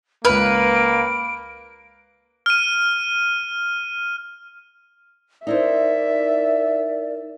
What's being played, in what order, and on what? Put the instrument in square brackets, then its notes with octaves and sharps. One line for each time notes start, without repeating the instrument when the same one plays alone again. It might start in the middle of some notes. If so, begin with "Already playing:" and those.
[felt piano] C#2 F6 [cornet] A#3 [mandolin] B4 [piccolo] D7
[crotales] F6 D#7
[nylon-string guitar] D#4 E4 C5 [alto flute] A#4 [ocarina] D5 [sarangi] E5